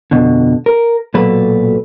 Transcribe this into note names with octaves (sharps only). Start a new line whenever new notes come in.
F2 B2 D3
A#4
B1 A#2 F#3 A4 B4 B5